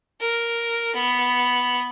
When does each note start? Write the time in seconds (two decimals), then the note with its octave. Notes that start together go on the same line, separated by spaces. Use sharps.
0.21 A#4
0.95 B3